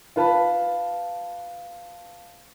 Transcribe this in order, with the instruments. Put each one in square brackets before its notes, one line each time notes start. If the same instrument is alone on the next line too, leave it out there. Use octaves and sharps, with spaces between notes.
[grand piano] F4 B4 A5 B5